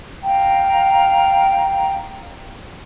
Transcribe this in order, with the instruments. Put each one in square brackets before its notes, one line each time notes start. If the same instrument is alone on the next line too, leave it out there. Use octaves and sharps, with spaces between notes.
[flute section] F5 G5 A#5